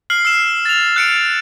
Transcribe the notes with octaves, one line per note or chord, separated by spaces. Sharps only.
F6 C7 F#7
E6 C7 E7
A6 F7
F#6 C#7 D7